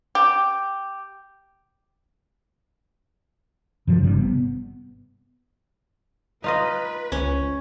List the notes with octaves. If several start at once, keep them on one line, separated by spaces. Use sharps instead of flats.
G4
F#2 C3 F3 F#3
G#1 G2 C3 G3
B3
D#4 F4 B4 D#5
C#2 C#4